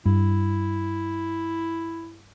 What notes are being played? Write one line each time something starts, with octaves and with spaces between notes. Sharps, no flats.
G2 E4